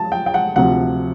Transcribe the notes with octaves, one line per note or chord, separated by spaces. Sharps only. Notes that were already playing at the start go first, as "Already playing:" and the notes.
Already playing: F3 A5
G5
G5
F#5
D2 C3 F3 F#5